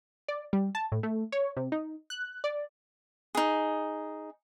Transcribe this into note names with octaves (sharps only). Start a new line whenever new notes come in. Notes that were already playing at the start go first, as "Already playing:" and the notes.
D5
G3
A5
A2
A3
C#5
C3
D#4
F#6
D5
D#4 G#4